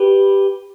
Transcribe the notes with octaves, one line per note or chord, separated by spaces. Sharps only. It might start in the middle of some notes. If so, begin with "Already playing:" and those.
Already playing: G4 B4